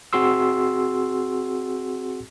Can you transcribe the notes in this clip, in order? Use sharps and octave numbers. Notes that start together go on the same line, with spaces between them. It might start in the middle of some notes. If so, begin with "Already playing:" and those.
C4 F#4 G#4 C6 E6